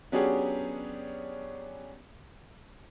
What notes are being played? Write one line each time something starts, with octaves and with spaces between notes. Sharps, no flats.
F#3 B3 C#4 D4 G4 G#4